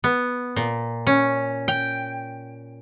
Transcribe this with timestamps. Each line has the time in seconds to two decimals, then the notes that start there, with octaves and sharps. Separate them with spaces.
0.04 B3
0.56 A#2
1.07 C#4
1.68 G5